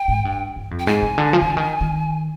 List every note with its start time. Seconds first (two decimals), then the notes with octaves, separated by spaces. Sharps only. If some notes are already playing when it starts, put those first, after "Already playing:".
Already playing: G5
0.08 G#2
0.25 G2
0.56 G2
0.71 F2
0.79 G5
0.86 G#2 G#5
1.02 C3
1.18 D3
1.33 F3
1.42 D#3
1.50 D3
1.57 D#3
1.81 D#3